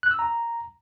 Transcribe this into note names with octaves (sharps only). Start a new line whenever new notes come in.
F#6
E6
A#5